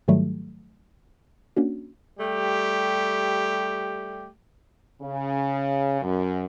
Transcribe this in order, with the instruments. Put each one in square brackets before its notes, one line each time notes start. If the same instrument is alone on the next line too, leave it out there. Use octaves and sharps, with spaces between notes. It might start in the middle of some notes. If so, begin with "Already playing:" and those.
[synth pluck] G#2 D#3 F#3 G3 A3
A#3 C#4 D4 F#4
[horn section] G3 A3 G4
[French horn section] C#3
F#2